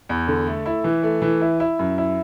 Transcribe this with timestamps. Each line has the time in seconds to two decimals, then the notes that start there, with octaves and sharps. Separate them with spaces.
0.09 E2
0.28 D3
0.47 A3
0.66 E4
0.84 E3
1.03 A3
1.22 E3
1.41 E4
1.60 E4
1.79 F#2
1.98 E4